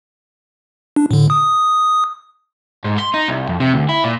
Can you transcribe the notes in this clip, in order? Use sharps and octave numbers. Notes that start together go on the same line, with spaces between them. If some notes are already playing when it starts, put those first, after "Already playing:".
D4
A2 D3
D#6
G#2
C6
D#4
C2
F2
C3
D2
E4
A#2